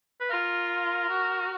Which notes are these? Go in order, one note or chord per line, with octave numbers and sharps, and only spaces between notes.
B4
F4 A#4
F#4